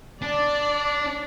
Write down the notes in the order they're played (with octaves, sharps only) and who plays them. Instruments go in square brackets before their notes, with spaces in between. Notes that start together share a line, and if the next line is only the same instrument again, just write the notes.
[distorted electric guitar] D4 [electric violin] D5